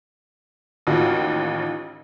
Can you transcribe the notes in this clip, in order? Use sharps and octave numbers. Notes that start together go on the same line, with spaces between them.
A1 D#2 F4 F#4